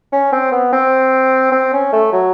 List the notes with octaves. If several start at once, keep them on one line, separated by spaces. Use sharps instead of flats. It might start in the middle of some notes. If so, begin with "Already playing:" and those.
C#4
C4
B3
C4
C4
C#4
A3
F#3